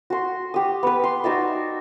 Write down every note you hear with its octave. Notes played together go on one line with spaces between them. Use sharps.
F#4 C6
G4 D#6
B3 B4
C6
D#4 F#4 D5 E5